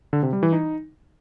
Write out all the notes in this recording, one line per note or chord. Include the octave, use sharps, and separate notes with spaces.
D3
C3
G3
E3
D#4